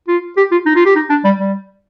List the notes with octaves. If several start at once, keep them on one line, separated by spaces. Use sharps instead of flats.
F4
G4
F4
D#4
F4
G4
D#4
D4
G3
G3